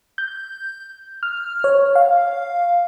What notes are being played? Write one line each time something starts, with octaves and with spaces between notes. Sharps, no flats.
G6
F6
C#5
F5